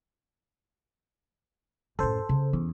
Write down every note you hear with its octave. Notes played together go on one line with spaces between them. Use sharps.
F#2 A2 A4 C5
C#3
E2 C#4